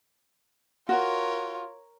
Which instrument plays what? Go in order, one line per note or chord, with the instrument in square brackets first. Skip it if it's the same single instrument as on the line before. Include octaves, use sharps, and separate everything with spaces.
[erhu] F4 [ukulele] F#4 [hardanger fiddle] A#4 C#5